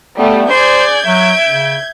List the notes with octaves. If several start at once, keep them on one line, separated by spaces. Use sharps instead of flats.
G3 A3 B3
G#4 C5 D5 G6 G#6
F#3 E5 D7
C#3